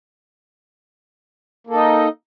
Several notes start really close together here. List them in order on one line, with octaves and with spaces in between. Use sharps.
A#3 A4 D#4 D#5